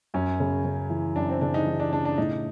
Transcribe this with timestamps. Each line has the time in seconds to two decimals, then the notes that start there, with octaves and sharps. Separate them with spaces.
0.14 F#2 C#4
0.40 C#3
0.65 C#3
0.90 E3
1.16 F#2 D4
1.29 C4
1.41 C#3 D4
1.54 D#4
1.66 E3
1.80 D4
1.92 C#3 D4
2.05 D4
2.18 A2 D#4